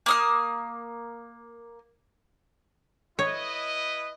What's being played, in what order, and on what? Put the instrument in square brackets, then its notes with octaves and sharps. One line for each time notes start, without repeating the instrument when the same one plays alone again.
[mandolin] A#3 D#6 F6
[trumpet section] E4 B4 D#5 [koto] C#5